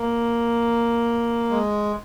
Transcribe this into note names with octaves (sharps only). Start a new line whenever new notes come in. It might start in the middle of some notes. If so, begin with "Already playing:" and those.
Already playing: A#3
G#3